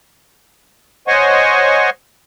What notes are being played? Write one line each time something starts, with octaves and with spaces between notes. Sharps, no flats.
C5 C#5 D#5 F#5 G#5 C#6